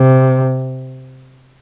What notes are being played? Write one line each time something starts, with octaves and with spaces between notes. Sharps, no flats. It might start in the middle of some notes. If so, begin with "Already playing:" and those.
Already playing: C3